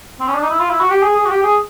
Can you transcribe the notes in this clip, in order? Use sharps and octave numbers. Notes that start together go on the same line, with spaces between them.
C4
C#4
D4
D#4
E4
F4
E4
F#4
G4
G#4
G#4
F#4
G4
G#4